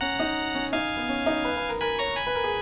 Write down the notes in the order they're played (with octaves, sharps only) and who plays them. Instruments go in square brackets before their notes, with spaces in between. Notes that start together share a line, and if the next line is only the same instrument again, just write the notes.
[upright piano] C#4 [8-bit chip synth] F#5 A#5
[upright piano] D#4
C#4
[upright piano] D#4 [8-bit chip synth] F5 G#5
[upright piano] B3
C#4
D#4
B4
B4
A#4
[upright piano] A#4 [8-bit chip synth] G#5 B5
[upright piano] C#5 [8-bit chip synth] A#5 C#6
[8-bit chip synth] G#5 B5
[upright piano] B4
A#4
G#4